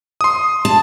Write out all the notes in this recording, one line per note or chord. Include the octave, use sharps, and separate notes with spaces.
C6 D#6
A5